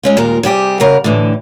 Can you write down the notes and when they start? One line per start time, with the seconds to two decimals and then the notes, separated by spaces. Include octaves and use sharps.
0.03 G#3 C#4 F4
0.17 D#2 A#2 G#3 F4 A#4
0.43 C3 G3 G4 G#4
0.80 C#3 A#4 F#5
1.04 A2 D3 E3 D4